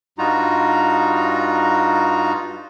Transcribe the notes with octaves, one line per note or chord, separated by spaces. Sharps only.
G2 G3 D#4 F4 F#4 A#5